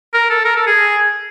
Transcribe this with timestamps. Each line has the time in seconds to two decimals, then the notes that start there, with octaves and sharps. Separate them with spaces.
0.14 A#4
0.30 A4
0.45 A#4
0.56 A4
0.66 G#4